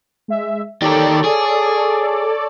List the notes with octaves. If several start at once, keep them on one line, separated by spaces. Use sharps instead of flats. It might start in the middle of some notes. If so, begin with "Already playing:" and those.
G#3 E5
D#3 G4 A4 C#5 D5
G#4